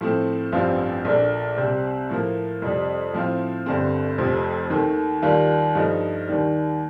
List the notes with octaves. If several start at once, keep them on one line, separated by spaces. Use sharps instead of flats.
A2 F3 A3 C4
A1 G2 F3 C4 F4
A#1 A#2 A3 D4
C2 C3 G3 C4
A2 F3 A#3
F2 C3 G3
A2 F3 C4 F4
G1 G2 D3 A3 C4
F1 F2 C3 F3
D#2 D#3 A3
D#2 D#3 G3 A#3 F4
G2 F3 A3 D#4
D#2 D#3 G3